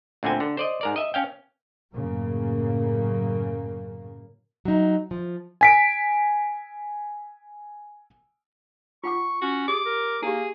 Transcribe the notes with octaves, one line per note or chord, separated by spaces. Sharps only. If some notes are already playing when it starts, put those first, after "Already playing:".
D2 A#2 D3 C4 G#5
D3
C5 D5 D#5
G#2 A#4 D5
D#5 E5
C#4 F5 G5
F#2 A2 C#3 A#3
F#3 D#4
F3
G#5 B6 D7
F4 F#5 C#6 D6
C#4 F#4
G4 G#4 D6
A#4
A#3 E4 G4 G#4